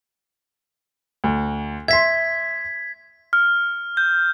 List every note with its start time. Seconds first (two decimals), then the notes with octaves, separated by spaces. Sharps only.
1.24 D2
1.88 E5 C6 G#6 B6
3.33 F6
3.97 G6